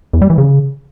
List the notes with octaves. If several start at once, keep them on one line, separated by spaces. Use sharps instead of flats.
E2
G3
E3
C#3